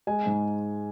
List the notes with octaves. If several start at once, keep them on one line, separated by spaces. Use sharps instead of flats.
G#3 G#5
G#2